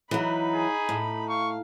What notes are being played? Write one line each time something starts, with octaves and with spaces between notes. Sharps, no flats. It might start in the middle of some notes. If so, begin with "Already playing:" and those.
E3 F#3 D#4 B5
G#4
A2
F5 C#6